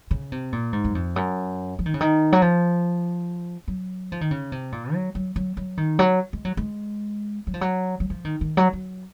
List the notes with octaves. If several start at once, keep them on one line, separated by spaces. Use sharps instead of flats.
C#3
C3
A#2
G#2
F#2
F2
F#2
F3
D#3
C#3
D#3
F#3
F3
F#3
F3
D#3
C#3
C3
A#2
F#3
F#3
F#3
F#3
D#3
F#3
G#3
F#3
G#3
F#3
F3
F#3
F#3
F3
D#3
D#3
F#3
F#3